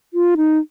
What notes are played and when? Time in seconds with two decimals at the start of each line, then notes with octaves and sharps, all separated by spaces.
0.14 F4
0.37 D#4